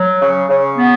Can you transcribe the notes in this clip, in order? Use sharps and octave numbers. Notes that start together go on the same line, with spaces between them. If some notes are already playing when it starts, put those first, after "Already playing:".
Already playing: F#3
C#3
C#3
B3